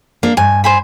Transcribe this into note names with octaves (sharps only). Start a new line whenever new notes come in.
A#3 D4
G2 G#5
C5 G#5 B5